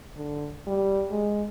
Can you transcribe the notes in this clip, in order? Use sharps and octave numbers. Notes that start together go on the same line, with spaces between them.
D3
G3
G#3